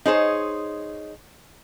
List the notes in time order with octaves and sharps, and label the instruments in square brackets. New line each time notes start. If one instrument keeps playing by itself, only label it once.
[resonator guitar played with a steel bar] D#4 G#4 C5 C#5